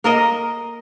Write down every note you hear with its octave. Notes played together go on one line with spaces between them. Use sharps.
A#3 A#4 D#5